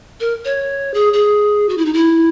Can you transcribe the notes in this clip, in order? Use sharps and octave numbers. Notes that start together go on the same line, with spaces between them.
A#4
C#5
G#4
G#4
F#4
E4
D#4
E4